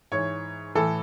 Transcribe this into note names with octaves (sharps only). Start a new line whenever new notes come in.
G#2 E3 C#5
A2 E3 A4